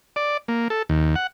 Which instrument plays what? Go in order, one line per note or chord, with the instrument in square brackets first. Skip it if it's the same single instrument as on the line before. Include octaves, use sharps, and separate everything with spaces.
[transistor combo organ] D5
A#3
A4
D#2
F#5